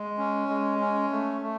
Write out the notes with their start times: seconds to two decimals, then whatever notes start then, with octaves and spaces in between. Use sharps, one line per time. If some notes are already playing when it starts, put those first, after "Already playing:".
Already playing: G#3
0.18 C#4
0.49 G#3
0.80 C#4
1.11 A3
1.41 A3